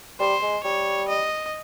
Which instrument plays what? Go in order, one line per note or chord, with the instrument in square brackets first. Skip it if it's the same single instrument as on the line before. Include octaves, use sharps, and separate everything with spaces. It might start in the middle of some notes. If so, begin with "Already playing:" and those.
[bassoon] G3 [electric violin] C5
[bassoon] G#3
[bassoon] G3 [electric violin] C#5
[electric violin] D#5